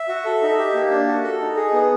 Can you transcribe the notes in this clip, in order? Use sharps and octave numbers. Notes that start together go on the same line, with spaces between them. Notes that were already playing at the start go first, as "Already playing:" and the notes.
Already playing: E5
F#4
A4
D#4
G4
A#3
D4
F#4
A4
D#4
G#4
B3